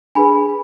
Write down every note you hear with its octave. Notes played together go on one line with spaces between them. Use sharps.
D4 G#4 B4 G#5 B5